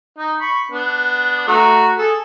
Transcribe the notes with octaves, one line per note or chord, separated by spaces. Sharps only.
D#4
B5 C#6
B3 D4
A3 F#4 A#5
G#4 A4